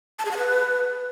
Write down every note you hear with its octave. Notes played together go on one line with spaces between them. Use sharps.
A5
G#4
F#5
B4